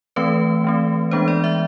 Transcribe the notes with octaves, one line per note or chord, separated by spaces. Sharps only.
E3 A3 C4 B4
E3 A3 C4
E3 G#3 B3 D4 C5
D5
E5